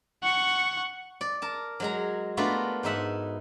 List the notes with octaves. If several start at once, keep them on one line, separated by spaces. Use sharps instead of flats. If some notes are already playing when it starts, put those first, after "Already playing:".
F#5 C#6
D5
A#4 A5
F#3 G#3 A#5
A3 B3 D4 F4 F#4 A#4
G#2 D#4 E5 F#5